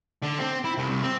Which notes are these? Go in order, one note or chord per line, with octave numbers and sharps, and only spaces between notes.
D3
C4
E4
C2
C2
C4